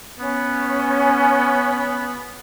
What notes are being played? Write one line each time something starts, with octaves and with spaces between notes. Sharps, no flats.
B3 C#4